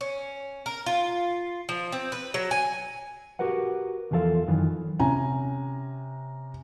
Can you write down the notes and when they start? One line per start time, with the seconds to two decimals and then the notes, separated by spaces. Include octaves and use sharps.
0.01 C#4
0.66 A#4
0.86 F4
1.69 F3
1.92 C4
2.12 B4
2.34 F#3
2.51 G#5
3.39 F#4 G4 A#4 B4 F#5
4.11 E2 E3 F3 G#4 A4 F5
4.48 F#2 D#3 E3 F4
5.00 C3 C#4 G#5 A#5